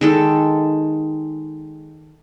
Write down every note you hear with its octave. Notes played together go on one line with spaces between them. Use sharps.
D#3 G#3 A4